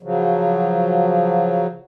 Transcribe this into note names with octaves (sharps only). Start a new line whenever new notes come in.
C#3 F3 F#3